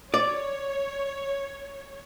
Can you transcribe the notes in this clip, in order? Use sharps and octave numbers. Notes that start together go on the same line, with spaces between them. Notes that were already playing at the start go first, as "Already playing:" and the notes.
C#5 D5